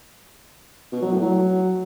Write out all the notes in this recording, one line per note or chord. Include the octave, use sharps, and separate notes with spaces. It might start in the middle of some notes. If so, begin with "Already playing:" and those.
B2
F#3
A2
F#3